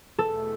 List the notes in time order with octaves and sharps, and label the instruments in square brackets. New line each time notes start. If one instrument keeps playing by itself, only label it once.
[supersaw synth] E2 B2 A3 [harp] A4